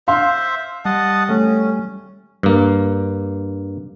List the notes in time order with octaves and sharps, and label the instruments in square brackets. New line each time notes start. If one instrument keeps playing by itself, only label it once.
[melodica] C5 E5 [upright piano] F5 C6
[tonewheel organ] G3 [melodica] D#5 F#5 A5
[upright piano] A3 [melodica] C#4
[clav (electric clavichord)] G2 A#3